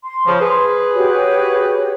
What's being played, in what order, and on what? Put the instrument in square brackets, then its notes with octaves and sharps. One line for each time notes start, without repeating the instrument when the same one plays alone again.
[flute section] C6
[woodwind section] C#3 F3
G#4 B4
[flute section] F#4 G4 C#5